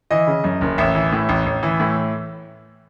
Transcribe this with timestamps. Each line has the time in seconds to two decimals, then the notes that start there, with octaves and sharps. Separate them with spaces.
0.11 E3 D#5
0.27 C#3
0.44 F#2
0.61 F#1
0.78 A1 E5
0.95 E3
1.12 A2
1.29 A1
1.46 A1
1.63 E3
1.79 A2